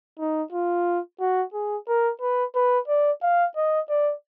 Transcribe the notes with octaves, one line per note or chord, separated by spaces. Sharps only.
D#4
F4
F#4
G#4
A#4
B4
B4
D5
F5
D#5
D5